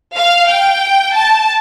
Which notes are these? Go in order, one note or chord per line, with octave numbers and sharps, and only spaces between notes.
F5
G5
A5